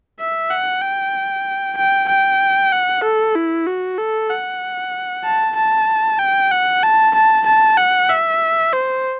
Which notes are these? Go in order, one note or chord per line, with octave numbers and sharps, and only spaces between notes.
E5
F#5
G5
G5
G5
F#5
A4
E4
F#4
A4
F#5
A5
A5
G5
F#5
A5
A5
A5
F#5
E5
C5